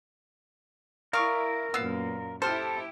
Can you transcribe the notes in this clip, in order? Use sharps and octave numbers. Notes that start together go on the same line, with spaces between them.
E4 A#4 D5 F5 C#6 D#6
F#2 A#2 B3 F5 E6
E4 G4 A4 C5 A5 F6